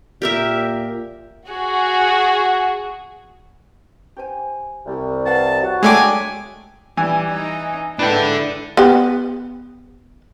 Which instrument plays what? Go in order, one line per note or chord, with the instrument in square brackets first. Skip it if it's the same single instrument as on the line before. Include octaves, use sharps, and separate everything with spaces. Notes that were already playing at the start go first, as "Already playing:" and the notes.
[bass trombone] A#2 [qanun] G4 A#4 E5
[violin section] F#4 G#4
[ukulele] G4 C5 G#5
[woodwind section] C2
[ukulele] B4 F5 F#5 [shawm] A5
[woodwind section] F#4
[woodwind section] F#3 D4 [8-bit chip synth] G#3 A3 D6 [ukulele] G5 A#5 [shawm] G#5
[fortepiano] E3 G#5 [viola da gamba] G3
[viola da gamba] D#4
[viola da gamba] G#2 E4 [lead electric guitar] D4 A4 [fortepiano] B4 G5
[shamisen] B3 G4